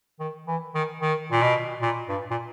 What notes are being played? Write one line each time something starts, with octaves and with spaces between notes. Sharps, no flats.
D#3
E3
D#3
D#3
A#2
B2
A#2
G2
A#2